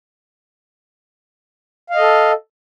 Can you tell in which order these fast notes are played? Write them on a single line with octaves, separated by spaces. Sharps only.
F5 D#5 A4